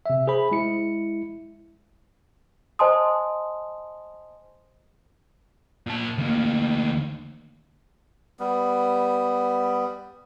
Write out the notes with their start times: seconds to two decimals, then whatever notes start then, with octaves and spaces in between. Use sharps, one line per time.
0.06 C3 E5
0.27 G#4 C5 B5
0.51 G#3 E4 C#7
2.79 C5 D#5 G#5 A5 C6 D#6
5.86 A#2 A5
6.18 D2 A#3
8.39 G3 B3